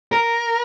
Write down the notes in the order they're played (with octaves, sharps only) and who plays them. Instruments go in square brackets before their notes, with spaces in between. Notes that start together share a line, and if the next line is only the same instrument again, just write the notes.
[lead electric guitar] A#4